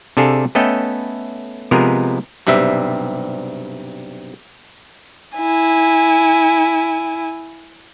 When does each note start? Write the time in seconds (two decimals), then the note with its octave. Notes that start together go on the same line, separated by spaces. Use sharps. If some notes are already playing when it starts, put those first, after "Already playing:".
0.17 C3 D4 G#4 A4 F5
0.55 A3 B3 C#4 A4 D#5 G5
1.71 C3 F3 G#3 B3 G#4 A#4
2.47 B1 G2 C3 G3 E5
5.37 E4 G#5